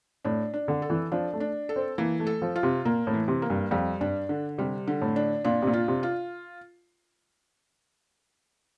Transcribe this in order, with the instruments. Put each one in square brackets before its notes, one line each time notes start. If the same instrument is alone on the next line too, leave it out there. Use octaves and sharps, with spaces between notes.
[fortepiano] A2 [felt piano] D4
[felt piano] D4
[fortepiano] D3
[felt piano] A4
[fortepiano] E3
[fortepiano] F3 [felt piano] D4
[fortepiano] A3
[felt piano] D4
A4
[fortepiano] C4
[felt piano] E3 [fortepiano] A#3
[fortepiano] A3
[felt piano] A4
[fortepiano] F3
[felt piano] F4
[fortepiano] C3
[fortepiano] A#2 [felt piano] A#3
[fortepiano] A2
[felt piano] E3
[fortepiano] C3
[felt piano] A#3
[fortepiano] G2
[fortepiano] F2 [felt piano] G3
[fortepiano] G2 [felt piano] D4
[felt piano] D3
[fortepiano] C3 [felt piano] G3
[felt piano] D3
[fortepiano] A2
[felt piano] D4
[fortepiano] A#2 [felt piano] D4
[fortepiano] C3
A#2
[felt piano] F4
[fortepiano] C3
[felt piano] F4